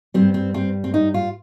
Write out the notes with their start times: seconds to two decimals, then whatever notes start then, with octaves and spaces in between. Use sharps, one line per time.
0.14 G2 G3 C4
0.34 C4
0.54 C4
0.84 C4
0.94 D#4
1.14 F4